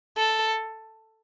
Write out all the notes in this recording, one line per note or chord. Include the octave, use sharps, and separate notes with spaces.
A4